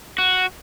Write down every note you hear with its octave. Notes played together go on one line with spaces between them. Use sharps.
F#4